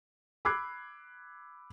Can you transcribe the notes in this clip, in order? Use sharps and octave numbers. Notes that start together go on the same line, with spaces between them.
B5 D6 E6 F#6 G#6 C7